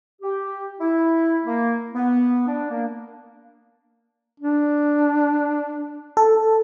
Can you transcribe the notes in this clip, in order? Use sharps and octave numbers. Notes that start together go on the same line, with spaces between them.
G4
E4
A#3
B3
D4
A#3
D4
A4